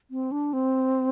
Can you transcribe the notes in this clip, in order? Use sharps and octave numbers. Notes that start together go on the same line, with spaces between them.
C4
D4
C4